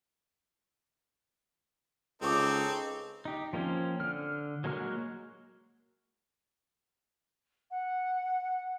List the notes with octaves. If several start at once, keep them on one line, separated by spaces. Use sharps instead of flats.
C#2 C4 D#4 G#4 A4 C#6 D6
D#4 G4
F3 A#3 C4 C#4
D3 F6
F#3 G#3 A#3 F#4 F6
F#5